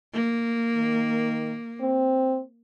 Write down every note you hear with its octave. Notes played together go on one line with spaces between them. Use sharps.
A#3
D#3
C4